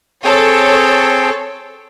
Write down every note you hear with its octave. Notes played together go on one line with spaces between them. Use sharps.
C4 G#4 A4 C#5 G5